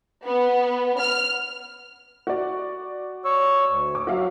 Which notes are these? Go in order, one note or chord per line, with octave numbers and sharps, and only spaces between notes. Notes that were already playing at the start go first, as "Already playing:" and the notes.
B3
F6
F#4 D5
C#5 C#6 E6
D2
D6
F#3 F#4 E5 F5